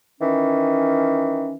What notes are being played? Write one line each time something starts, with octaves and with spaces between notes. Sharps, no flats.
D#3 E3 C#4